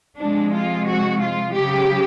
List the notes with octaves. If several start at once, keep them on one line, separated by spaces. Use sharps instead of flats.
C3 F3 G#3 D4
F4
F#4
F4
C#3 F#3 G4